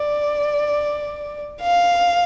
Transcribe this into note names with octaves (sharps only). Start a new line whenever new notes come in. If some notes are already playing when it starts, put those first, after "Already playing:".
Already playing: D5
F5